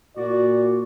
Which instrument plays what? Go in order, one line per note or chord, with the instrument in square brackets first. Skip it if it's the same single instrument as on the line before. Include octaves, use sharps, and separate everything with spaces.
[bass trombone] A#2 [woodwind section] F#4 [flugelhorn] D5